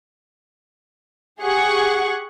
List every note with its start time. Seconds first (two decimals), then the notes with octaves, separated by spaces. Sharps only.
1.40 G4 G#4 F#5 C#6